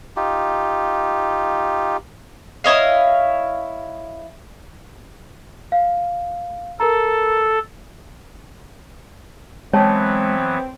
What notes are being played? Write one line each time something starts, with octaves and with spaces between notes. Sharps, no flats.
D#4 F4 G4
E4 C#5 D#5 F5
F5
A4 A#4 A#5
E3 F#3 G#3 B3 C4 C#5 G5 A5